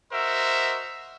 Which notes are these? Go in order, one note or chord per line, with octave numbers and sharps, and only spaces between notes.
F#4 A#4 C5 D#5 E5